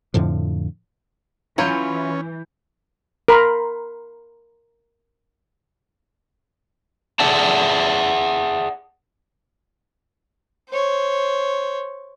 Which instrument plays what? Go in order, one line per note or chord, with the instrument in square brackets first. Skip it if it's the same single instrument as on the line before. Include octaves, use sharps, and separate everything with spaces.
[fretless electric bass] F2 A2 D3 F3
[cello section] E3 [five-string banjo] F#3 F4 C#5 [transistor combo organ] C#4 [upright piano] B5 G6
[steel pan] A#4 B5 C6
[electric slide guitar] G#4 D5 E5 F#5 A5
[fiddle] C5 C#5